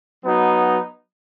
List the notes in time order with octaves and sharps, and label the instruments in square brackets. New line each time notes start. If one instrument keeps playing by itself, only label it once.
[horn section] F#3 B3 D#4